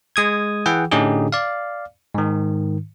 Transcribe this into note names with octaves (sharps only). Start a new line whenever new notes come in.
G#3 D#6 G#6
E3 G#4 F#5 G5
A2 D3 C#4 D#4 G4 G#4
D5 F5
G#2 D#3